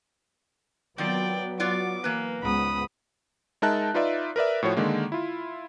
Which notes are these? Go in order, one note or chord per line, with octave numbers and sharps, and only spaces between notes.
D#3 F#3 B3 C4 F4 D5 G5
F4 F#4 D5 D6
E3 A#3 B4
C#2 G#2 B3 B5 D#6
G#3 D#4 A#4 E5 A5 F#6
D#4 F4 B4 D5 E5
A#4 B4 D5 E5
A2 F3 F#4 C#5
D3 D#3 G#3 A#3
E4 F4